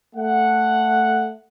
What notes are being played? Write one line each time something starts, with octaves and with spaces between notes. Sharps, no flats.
A3 F#5